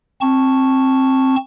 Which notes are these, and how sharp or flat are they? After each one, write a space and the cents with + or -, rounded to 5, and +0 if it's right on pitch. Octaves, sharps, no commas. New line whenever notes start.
C4 +15 A5 +0 C#6 +0